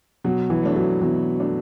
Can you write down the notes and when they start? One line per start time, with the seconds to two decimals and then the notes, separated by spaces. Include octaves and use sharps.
0.24 B2 F#3
0.50 E3
0.63 A3 D4
0.76 F#3
1.01 B2 E3
1.40 A3 D4